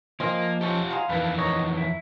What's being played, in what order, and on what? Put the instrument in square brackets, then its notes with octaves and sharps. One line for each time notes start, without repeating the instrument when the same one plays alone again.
[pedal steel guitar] F3 D#5 F6 [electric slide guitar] A#3 [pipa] C4 G#4
[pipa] C#4 A4 [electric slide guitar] F4 G4
[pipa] F#3 G#3 G#4 [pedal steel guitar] F5
[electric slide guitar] F2 D#3 E3 [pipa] D4 B4
[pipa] A#4 C#5 [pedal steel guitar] D#5
[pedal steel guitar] E4